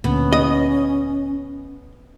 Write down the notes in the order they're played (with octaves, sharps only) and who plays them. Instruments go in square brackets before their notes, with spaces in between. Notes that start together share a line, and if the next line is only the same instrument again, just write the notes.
[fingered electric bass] D2 A#2 [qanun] B3 [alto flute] C#4
[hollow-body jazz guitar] D#5